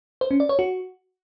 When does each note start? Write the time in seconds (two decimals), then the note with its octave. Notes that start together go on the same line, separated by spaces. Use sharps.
0.21 C5
0.31 C#4
0.40 D5
0.49 C#5
0.59 F#4